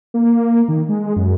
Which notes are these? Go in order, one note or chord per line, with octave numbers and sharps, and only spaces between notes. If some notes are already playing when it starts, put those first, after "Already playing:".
A#3
D#3
G#3
F#2